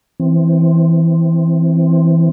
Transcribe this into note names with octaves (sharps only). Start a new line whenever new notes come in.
E3 C4